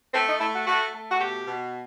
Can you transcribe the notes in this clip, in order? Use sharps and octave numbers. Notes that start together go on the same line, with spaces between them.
A3 C4
D#4
A3 E4
F#4
A3 F#4
A3
F#4
B2 G4
B2